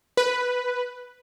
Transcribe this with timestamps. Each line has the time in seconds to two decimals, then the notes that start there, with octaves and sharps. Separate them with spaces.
0.17 B4